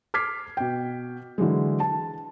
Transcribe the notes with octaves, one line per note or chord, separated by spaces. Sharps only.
D6 F6 G#6 B6 C7
B2 G5
D3 E3 F#3 G#3
A5